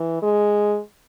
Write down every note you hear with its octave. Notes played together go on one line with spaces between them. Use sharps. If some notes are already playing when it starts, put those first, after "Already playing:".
Already playing: E3
G#3